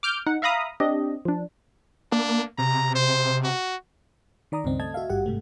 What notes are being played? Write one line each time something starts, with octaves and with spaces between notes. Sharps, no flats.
D6 F6 G6
D#4 F#5
E5 F5 A#5 B5 D#6
C4 D4 G4 D#5
F3 D4
A#3 D4
C3 A#5
C5
F#4
D#3 D5 A#5 D#6
C#2 G2 C#3 C4 D#5
A3 D#5 A5 G#6
F#4 E5 F5
G#1 G2 G4 F#5
G#2 C3 A3